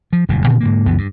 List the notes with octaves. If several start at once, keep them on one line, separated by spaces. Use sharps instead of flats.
F3
F#1 E2 G2 A#2
A#2 D3 D#3 C4
G#2 D3 A#3
C#2 F#2 E3 B3
G2